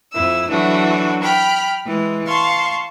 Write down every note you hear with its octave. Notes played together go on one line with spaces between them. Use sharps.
F2 E4 E6
E3 F#3 A3 D4 F#4
G5 B5 F6
E3 G#3
F5 A5 C6 C#6